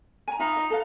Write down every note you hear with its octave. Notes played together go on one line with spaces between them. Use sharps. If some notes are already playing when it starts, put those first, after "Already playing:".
G#5 A#5
D#4 F4 E5 B5
D#5
A4 B4 F5